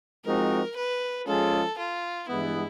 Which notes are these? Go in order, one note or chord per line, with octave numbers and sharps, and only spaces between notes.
F3 G#3 C4 D#4 F#4 A#4
B4
F3 G#3 C#4 F4 G#4 A4
F4
G2 E3 G#3 B3 E4